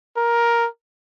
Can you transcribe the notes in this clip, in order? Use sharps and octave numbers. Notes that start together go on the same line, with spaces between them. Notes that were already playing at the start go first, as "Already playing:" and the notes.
A#4